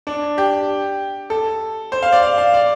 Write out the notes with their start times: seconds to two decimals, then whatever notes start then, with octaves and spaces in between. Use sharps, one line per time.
0.07 D4
0.38 G4
1.30 A4
1.92 C5
2.02 F5
2.12 D5
2.23 F5
2.38 F5
2.54 D5